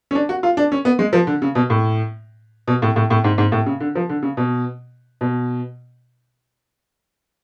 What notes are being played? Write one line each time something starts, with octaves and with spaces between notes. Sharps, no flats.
C#4
D4
F#4
F4
D4
C#4
B3
G#3
F3
D3
C#3
B2
A2
B2
A2
A2
A2
G#2
G#2
A2
C#3
D3
F3
D3
C#3
B2
B2